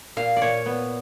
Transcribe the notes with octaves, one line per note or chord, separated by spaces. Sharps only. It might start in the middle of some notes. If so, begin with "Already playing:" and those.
A#2 F5
D5
A#2 C#5
B3